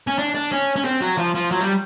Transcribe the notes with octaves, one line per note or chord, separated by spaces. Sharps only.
C#4
D4
D4
C#4
C#4
C4
F#3
F3
F3
F#3
G3